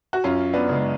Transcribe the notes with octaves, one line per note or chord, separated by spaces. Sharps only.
F#4
F#2 C#4 F4
B3 D4
C#3 G#3